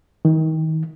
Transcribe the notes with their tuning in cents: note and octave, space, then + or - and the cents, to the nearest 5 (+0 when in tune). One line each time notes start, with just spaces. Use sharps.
D#3 +30